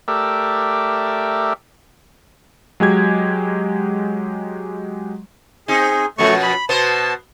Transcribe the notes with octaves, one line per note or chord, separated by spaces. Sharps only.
A3 G4 A#4 D5 E5
F#3 G#3 G4 G#6
C4 D#4 G#4
F#2 B2 F3 A3 C#6
B5
B2 B3 C5 A5